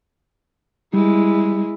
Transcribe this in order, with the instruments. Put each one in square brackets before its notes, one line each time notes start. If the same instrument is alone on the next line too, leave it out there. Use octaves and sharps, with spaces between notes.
[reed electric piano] G3 [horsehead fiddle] G#3 E4